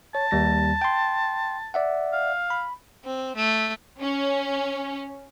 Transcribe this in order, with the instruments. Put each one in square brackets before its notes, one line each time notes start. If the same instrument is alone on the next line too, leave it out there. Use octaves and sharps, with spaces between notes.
[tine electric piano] C#5 [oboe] A5
[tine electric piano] D#2 G3 A#6
G5 C6
D5 E5 F#5
[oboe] F5
[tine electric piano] B5
[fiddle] C4
A3
[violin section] C#4